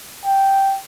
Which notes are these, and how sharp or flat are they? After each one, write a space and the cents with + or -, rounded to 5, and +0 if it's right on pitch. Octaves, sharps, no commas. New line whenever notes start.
G5 -5